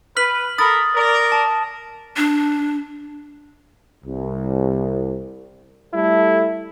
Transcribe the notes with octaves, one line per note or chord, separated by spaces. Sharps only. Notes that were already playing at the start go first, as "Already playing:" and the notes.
B4 F6 B6 F#7
A4 A#4 B5 D#6 A6
A#4 D5
A5
D4
C2
G3 A3 E4 A4